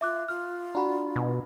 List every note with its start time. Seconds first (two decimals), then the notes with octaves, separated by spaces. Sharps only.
0.01 F4 E5 D6 F#6
0.28 F4 F6
0.75 D4 F#4 A#5 B5
1.16 B2